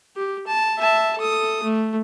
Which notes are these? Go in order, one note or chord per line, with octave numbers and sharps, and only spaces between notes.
G4
A5
E5 A5
A4 D#6
A3